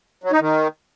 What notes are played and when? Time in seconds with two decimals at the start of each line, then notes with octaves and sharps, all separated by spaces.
0.24 F#3
0.32 D#4
0.40 D#3